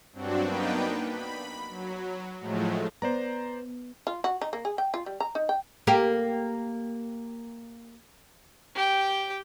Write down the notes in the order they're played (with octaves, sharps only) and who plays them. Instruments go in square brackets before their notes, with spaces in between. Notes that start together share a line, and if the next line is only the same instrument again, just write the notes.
[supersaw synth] G2 F#3 C4 D4 F#4
A#3 B3 D4 D#4 B4 G5
B5
F#3
A2 F3 F#3 G#3 A3
[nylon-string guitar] B3 [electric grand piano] C5 D5 A#5
[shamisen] F4
F#4
D#4
A#3
G#4
G5
F4
G3
A#5
D#4
G5
[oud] A#3 G4 A#4
[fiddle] G4 G5